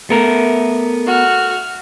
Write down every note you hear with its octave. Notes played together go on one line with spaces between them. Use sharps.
A3 B3 A#4
F#4 F6